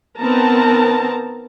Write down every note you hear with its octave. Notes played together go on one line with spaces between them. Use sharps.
D#3 B3 C4 A#4 A5 A#5